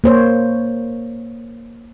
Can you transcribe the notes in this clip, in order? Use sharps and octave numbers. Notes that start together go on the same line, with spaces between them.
A#3 C5 C#5